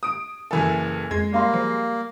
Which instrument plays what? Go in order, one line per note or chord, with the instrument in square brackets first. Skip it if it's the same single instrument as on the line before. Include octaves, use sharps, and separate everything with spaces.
[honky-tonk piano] D#6 D7
[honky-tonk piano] F#1 E3 A4 [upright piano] A#4 G#5 B5
[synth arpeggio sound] F2 G#6 [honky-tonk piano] G#3
[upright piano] G3 F5 C6 [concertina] A#3
[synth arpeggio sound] F3